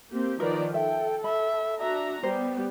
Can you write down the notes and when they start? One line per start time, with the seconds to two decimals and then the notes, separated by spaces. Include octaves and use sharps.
0.11 A#3 C4 G4
0.40 D#3 F3 A#4 B4 D5 A#5
0.74 A4 E5 G5
1.24 E5 B5
1.81 D4 F#4 E5 A#5
2.23 G3 B3 G4 C5